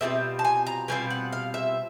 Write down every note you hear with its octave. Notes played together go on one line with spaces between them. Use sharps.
B2 G3 C4 F4 E5
A5
G#5
A#5
B2 G3 C4 F4 G#5
F#5
F5
E5